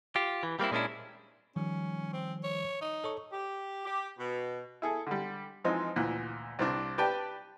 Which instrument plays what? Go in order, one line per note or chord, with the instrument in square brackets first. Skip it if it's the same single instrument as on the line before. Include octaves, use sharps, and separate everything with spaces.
[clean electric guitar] F4 G4
E3
G3 A#3 C4 E4
A#2 G#3 C#4 D4 E4
[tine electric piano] D#3 F3 G3 [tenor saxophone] C#4
[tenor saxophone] C4
C#5
D#4
[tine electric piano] A4 C#5 C#6
[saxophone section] G4
G4
B2
[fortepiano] E4 G#4 A4
D3 G3
E3 F3 G#3 C4 D#4
D2 A#2 E3 F#6
C2 C4 D4
G4 B4 D5 G5 A5